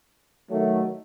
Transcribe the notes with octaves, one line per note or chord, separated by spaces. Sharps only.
D#3 F#3 A3